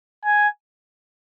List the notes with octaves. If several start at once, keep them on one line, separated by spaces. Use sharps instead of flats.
G#5